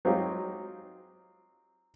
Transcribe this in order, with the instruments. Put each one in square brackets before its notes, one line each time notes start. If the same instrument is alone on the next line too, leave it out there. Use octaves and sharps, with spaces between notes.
[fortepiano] F#3 C4 D#4 F4 G4 G#4